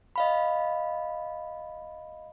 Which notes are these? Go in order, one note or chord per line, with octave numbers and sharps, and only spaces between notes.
D#5 F5 B5